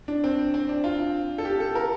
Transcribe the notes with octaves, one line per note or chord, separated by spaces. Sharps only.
D4
C4
C4
D4
F4
A4
G4
A4
A#4